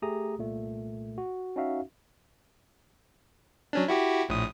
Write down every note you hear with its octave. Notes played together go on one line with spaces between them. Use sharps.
A3 G4 G#4 A#5 D#6
C2 A#2 A3
F#4
C#4 D#4 F#4 E5 F5
F#3 C#4 D4
E4 F#4 G4
A#1 A2 D#6